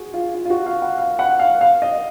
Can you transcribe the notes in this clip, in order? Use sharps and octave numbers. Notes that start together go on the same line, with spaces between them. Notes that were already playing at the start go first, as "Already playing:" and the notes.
Already playing: F#4 G#4
F4
F4
F4
F#4
F5
F#5
F5
F#5
F5
F5
D#5